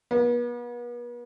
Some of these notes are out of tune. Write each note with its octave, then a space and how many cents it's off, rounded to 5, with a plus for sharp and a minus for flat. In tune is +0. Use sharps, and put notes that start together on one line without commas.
B3 -40